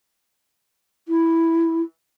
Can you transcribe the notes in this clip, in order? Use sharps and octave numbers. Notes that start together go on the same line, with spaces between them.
E4